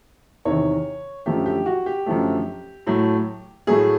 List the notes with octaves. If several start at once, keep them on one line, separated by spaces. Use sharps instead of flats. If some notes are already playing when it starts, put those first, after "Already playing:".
E2 C3 D#3 C#5
F#2 D3 F3 A3 G4
G4
F#4
G4
F#2 D3 F3 A3
A2 F#3 A3
A2 F#3 A3 G#4